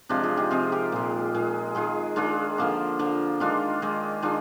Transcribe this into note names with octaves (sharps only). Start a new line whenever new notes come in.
C3 F3 G#3 D4 F4
F4 G#4
D#4 G4
C3 F3 G#3 F4 G#4
G4 A#4
A#2 G#3
A#2 G#3
D#3 G#3 F4 G#4
D#3 G#3 D4 F4
D3 F3 A#3
D3 F3 A#3
D#3 G#3 D4 F4
D#3 G#3
D#3 G#3 D4 F4